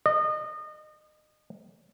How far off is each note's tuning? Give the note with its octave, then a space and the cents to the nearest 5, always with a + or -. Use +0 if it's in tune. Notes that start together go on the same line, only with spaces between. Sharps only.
D#5 -30